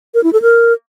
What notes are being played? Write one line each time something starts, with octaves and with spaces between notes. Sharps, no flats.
A#4
E4
A4
A#4